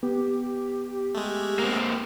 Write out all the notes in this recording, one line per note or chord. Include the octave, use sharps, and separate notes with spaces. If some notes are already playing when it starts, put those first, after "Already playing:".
B3 G4
G#3 A3
A#3 C4